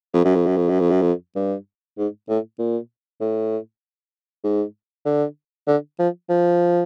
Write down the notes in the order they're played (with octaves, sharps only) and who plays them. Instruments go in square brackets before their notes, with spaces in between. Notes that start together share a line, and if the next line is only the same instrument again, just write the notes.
[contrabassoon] F2
F#2
F2
F#2
F2
F#2
F2
F#2
F2
G2
G#2
A2
A#2
A2
G#2
D3
D3
F3
F3